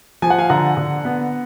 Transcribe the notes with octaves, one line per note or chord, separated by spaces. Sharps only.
F3 G#5
F#5
F5 G#5
D3 F#5 A#5
D3
B3